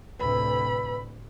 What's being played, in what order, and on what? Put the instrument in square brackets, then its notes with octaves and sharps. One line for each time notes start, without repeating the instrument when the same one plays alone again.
[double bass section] D2 A2 C3 [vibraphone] B4 E6 [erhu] B5